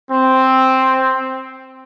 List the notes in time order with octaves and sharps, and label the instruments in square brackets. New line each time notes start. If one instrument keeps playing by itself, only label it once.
[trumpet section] C4